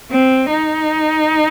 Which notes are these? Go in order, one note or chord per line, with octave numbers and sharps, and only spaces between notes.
C4
D#4